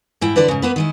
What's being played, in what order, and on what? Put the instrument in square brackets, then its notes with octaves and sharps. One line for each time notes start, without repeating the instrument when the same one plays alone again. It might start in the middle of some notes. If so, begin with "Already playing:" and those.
[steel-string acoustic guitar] G#2 E4 G5
D3 B4 C5 D5
G#2 C#3
A#3 B3 B4
D#3 G#3 E4